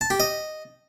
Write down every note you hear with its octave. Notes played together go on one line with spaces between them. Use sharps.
A5
G4
D#5